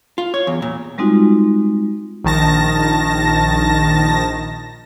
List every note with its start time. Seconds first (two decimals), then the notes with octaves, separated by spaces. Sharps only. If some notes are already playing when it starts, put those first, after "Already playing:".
0.18 F4
0.34 C#5
0.47 E2
0.62 A#2
0.98 G3 G#3 C4 D#4 F4 F#4
2.24 A#1 D#3 A5 A#6